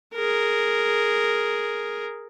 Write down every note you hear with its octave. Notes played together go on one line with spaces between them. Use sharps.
G#4 A#4